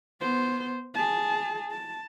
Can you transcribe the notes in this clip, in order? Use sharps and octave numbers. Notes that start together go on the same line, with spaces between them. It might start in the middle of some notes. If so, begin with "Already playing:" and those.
B3 C5
G#4 A5
A5